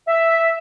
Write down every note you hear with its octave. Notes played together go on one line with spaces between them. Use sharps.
E5